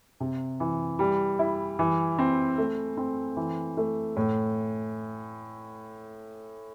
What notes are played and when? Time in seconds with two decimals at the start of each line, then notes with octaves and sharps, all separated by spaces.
0.20 C3
0.60 E3
0.99 G3
1.39 E4
1.79 E3
2.19 C4
2.58 A3
2.97 C4
3.37 E3
3.77 A3
4.16 A2